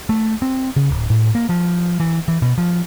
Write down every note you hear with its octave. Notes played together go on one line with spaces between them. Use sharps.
A3
C4
C#3
D1
A2
A#3
F3
E3
E3
B2
F3